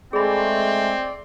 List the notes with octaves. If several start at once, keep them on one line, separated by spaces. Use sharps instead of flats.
G#3 A3 C4 G#4 D5 B5